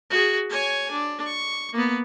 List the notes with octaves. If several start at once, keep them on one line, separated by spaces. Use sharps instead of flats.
F#4 G#4
C#5 G#5
D4
C#6
A#3 B3